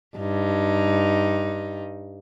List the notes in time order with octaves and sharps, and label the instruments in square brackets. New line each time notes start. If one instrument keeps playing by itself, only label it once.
[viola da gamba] G2 D#4